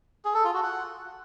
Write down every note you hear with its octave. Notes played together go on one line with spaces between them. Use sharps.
G#4
A4
F4
F#4
F#5